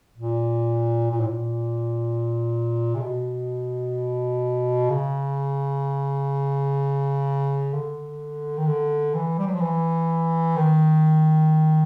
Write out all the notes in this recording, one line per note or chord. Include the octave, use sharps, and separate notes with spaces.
A#2
A#2
A2
A#2
C3
B2
C#3
D3
D#3
D3
E3
G3
F#3
F3
E3
D#3